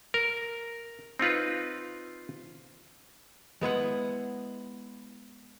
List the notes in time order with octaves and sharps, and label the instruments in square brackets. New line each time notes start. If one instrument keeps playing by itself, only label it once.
[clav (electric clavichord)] A#4
C4 D#4 F4 B4
[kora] G#3 B3 E4 F#5